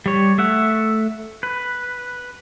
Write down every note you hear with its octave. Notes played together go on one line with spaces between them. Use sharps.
G3 C#5
A3 E5 F#5
B4